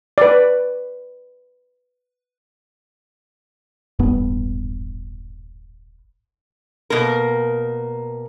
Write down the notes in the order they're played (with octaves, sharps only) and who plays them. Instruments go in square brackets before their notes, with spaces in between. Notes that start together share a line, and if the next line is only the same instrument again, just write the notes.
[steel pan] B4 D5
[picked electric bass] D#1 A1 G2 B3
[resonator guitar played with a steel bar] B2 A#3 A#4